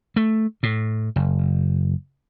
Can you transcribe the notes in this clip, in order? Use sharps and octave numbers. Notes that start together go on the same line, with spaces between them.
A3
A2
F#1